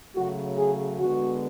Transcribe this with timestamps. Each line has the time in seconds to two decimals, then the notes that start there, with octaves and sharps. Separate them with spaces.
0.15 C#3 F#3 A3 F#4
0.58 G#4
1.00 D3 G#3 B3 F#4